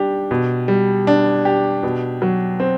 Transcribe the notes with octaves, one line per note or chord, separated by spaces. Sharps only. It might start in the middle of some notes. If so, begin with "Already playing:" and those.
Already playing: G3 D4 G4
B2
G3
D4
G4
B2
F#3
C4